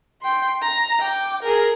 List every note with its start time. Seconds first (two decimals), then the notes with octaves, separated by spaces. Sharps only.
0.22 G5 C6
0.62 A#5
1.00 G5 D6
1.43 G#4 A#4